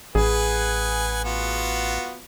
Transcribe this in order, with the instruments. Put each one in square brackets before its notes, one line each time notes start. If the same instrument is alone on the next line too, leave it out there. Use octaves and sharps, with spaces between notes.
[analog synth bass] A1 [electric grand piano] G#4 [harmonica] B4 F#5 G#5
[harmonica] B3 F4 F#4